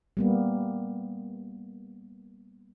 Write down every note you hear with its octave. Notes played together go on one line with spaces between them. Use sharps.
G3 A#3 B3